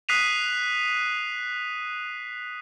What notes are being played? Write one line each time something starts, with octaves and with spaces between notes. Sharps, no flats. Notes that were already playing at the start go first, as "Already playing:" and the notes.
D#6 F#6 B6 C7 D#7 F7